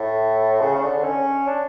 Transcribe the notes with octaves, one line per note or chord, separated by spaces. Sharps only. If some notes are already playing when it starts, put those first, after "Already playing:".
Already playing: A2
C#3
C#3
D3
C#4
D4